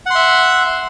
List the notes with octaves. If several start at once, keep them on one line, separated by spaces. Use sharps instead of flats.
E5 F#5 C6